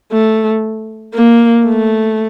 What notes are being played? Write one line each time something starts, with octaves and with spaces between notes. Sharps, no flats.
A3
A#3
A3